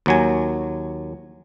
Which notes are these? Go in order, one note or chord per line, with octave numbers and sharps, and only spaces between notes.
D#2 F#3 G#5